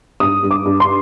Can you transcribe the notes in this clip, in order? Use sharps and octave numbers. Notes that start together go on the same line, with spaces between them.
G2 D#6
G2
D6
G2
C6